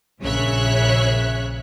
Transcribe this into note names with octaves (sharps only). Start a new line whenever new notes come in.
A#1 C#3 C#5 E5 F#6